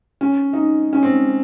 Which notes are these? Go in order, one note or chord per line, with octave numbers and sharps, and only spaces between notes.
C#4
D#4
C#4
C4